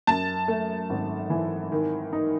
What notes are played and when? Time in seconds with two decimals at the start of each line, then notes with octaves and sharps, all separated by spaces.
0.07 F#2 A5
0.48 A3
0.90 G#1
1.30 E3
1.72 D#3
2.13 D#4